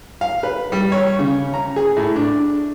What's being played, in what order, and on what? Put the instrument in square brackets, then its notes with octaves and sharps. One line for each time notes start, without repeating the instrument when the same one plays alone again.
[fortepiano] F5
B4
G3
C#5
C#3
A#5
G#4
A2
D4